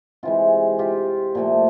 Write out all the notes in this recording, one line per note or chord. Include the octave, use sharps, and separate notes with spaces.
C3 E3 G#3 F4 G4
F4 G4
A#2 F3 A3